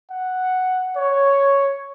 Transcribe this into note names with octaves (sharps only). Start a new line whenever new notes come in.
F#5
C#5